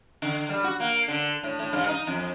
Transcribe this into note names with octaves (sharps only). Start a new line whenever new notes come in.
D3
G3
F#4
A#3
D3
A2
A2
G2
D#4
F2